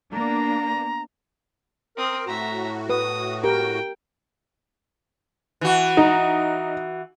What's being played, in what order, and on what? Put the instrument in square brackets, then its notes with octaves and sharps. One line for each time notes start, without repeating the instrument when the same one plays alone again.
[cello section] A#3 B3 D4 [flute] A#5
[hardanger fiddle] C4 D#6 [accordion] A#4
[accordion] A2 F#4 [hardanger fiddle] E5 A#5
[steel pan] B4 [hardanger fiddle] D#6
[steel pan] G4 A#4 [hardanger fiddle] G5
[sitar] E3 F#4
[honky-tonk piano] D#4